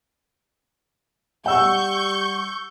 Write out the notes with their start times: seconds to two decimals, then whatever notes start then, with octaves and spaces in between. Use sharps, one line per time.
1.46 G3 F#5 C#6 E6 G6